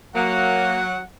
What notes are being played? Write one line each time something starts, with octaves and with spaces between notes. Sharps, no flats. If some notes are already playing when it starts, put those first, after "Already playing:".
F#3 A#3 F#5